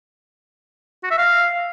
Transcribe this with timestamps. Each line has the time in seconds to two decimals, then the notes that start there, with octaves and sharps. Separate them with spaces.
1.03 F#4
1.11 E5
1.18 F5